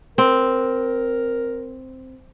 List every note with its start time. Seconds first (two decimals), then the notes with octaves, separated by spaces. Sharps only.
0.18 C4 A#4